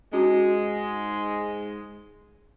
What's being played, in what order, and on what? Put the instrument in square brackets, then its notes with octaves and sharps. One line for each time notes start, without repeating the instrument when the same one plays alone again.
[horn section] G#2 G#3 [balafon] C#4 F#4